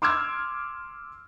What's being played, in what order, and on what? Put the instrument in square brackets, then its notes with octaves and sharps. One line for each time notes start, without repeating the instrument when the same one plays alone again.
[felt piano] C6 D6 E6 F6 G#6